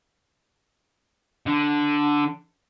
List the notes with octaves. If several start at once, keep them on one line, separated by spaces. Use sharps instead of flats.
D3